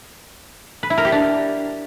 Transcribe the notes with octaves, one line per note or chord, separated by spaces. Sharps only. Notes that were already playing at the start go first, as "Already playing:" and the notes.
B4
E4
A#4
G4
D4